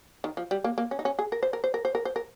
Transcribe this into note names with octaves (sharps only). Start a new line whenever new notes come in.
D#3
F3
G3
A#3
A#3
C#4
D#4
C#4
G#4
A#4
C5
A#4
C5
A#4
C5
A#4
C5
A#4